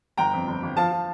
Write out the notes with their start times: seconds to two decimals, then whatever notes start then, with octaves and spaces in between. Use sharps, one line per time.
0.18 G1 G5 A#5
0.33 F2
0.47 G1
0.63 G1
0.77 F3 F5 A5
0.92 F3